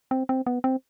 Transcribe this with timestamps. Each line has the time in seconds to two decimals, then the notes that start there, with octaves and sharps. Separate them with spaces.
0.11 C4
0.29 C4
0.46 B3
0.64 C4